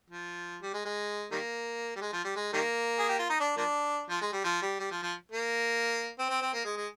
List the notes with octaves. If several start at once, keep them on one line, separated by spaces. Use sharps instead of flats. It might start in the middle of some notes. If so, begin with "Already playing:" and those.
F3
G3
G#3
G#3
D#3 G3 A#3
G3
G#3
F3
G3
G#3
D#3 G3 A#3
G#4
G4
F4
D#4
D4
F3 A#3 D4
F3
G#3
G3
F3
G3
G3
F3
F3
A#3
C4
C4
C4
A#3
G#3
G#3